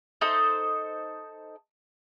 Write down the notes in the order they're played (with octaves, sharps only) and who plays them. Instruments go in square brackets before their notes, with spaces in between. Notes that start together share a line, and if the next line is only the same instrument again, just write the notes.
[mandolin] D#4 A4 C5 D#5